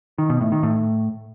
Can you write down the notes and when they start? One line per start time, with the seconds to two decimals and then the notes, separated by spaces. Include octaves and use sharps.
0.18 D#3
0.30 B2
0.41 A2
0.52 D#3
0.63 A2